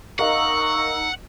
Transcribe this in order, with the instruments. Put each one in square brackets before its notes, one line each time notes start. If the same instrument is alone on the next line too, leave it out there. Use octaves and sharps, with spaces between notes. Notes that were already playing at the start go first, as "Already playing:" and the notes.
[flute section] D#4 A#5 E6 [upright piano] A#4 D#5 F5 [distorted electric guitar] F#5 [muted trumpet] C#6